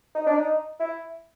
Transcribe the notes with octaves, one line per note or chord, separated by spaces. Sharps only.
D#4
D4
D#4
E4